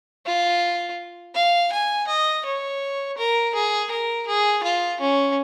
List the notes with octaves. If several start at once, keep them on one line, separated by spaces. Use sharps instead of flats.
F4
F5
G#5
D#5
C#5
A#4
G#4
A#4
G#4
F4
C#4